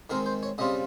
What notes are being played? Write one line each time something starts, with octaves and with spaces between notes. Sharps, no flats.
D#3 G#3 C4 A#4
C5
C#5
C#3 G3 C4 F4 D#5